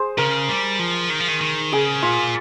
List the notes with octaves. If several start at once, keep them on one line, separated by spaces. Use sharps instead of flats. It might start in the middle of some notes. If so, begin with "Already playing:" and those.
Already playing: G#4 C5
C#3 A#4
G3
F3
D#3
F3
D#3
D#3
C#3 G#4
A#2 F4